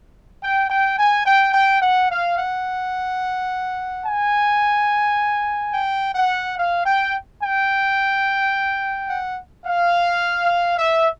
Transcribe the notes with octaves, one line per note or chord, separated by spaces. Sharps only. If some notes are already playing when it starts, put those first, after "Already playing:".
G5
G5
G#5
G5
G5
F#5
F5
F#5
G#5
G5
F#5
F5
G5
G5
F#5
F5
E5